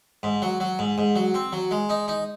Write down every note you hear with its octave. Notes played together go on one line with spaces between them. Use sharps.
G#2
F#3
F#3
G#2
G#2
F#3
C4
F#3
G#3
D#4
D#4